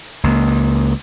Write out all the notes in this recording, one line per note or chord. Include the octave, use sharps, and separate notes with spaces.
C#2 A#3